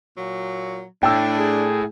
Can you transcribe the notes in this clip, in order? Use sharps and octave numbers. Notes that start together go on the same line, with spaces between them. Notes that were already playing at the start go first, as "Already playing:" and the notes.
A#2 F#3
A2 D4 G5 A5 E6
G#4